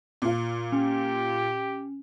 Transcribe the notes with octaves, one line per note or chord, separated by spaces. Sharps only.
A#2 F4
C#4 G4